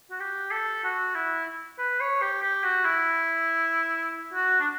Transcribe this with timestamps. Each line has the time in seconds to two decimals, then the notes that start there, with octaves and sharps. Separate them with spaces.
0.10 F#4
0.20 G4
0.51 A4
0.84 F#4
1.15 E4
1.79 B4
2.00 C#5
2.21 G4
2.42 G4
2.64 F#4
2.85 E4
4.34 F#4
4.60 D4